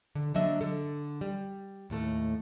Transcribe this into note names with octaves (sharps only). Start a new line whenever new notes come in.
D3
D3 F#3 A#3 D4 D#5 E5
D3 A4
G3
D#2 A2 A3 A4